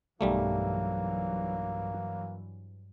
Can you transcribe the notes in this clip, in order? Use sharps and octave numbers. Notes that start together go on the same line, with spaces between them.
B1 G2 E3 F#3 G3 A3 A#3